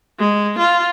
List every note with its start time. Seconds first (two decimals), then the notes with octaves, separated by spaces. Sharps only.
0.19 G#3
0.58 F4